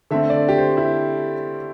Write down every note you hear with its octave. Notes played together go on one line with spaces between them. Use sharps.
D3 A3 C4 E5
D5
G4
C5
E4